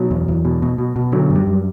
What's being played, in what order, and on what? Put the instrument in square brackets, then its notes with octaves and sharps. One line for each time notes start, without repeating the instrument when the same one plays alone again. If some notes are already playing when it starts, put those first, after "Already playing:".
Already playing: [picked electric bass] B2 F#3
E2
E2
B2
B2
B2
B2
D3 F#3
F#2
G3
F#2